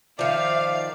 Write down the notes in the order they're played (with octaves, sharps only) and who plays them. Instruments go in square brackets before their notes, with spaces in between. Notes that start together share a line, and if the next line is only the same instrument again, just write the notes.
[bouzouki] D#3 F3 [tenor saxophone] D5 [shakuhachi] E5 [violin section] F5